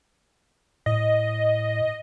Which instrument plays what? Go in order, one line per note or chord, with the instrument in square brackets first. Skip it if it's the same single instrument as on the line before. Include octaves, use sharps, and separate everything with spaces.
[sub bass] A2 [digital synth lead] D#5